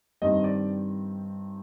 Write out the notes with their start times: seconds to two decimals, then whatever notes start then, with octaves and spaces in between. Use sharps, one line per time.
0.22 G2 D#3 G3 C4 D#5
0.44 D5